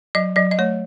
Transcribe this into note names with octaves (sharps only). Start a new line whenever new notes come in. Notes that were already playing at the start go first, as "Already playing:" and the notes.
F#3 D#5
F#3 D#5
D#5
A3 C#5